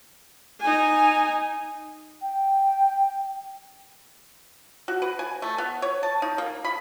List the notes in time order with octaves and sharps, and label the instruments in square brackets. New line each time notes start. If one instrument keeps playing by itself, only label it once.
[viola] D#4 G#5
[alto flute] G5
[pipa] F#4
B4
G#5
A3
B3
C#5
A5
D#4
A#3
B5